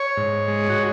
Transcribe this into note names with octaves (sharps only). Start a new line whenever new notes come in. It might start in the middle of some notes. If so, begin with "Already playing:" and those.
Already playing: C#5
G#2
G#3
F#4